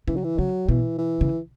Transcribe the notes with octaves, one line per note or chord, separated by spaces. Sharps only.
C#3 E3
F#3
E3
C#3 F#3
B2 E3
E3
C#3